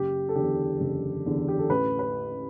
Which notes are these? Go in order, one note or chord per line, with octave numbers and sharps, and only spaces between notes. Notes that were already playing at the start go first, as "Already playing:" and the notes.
Already playing: F#1 G4
A4
E2 D3 G4
F#1
E2 D3
G4
A4
A1 B4
B4